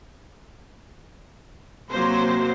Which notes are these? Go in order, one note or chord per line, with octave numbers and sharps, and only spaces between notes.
C3 F#3 A#3 C5